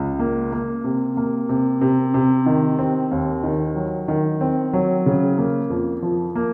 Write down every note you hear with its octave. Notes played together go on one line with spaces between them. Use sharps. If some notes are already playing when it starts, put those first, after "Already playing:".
Already playing: C#2
A#3
A#3
C3
A#3
C3
C3
C3
D#3
C4
D#2
D#3
F#3
D#3
C4
F#3
C#3
A#3
F2
F3
A#3